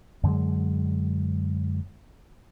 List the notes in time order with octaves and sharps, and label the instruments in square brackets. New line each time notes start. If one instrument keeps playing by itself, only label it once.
[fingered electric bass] F#2 D3 F#3 G#3